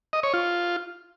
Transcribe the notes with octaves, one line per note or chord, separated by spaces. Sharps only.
D#5
C#5
F4